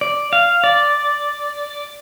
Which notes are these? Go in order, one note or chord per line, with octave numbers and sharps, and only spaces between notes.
D5
F5
D5